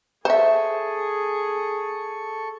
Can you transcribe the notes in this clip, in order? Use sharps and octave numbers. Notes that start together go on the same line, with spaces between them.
G#4 A4 C5 E5 C#6